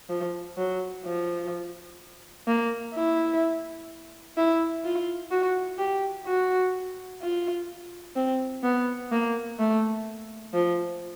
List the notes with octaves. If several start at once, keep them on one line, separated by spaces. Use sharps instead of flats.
F3
F#3
F3
A#3
E4
E4
F4
F#4
G4
F#4
F4
C4
B3
A#3
A3
F3